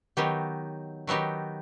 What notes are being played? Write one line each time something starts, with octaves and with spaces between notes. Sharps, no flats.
D#3 F#3 B3 D#4 G4
D#3 F#3 B3 D#4 G4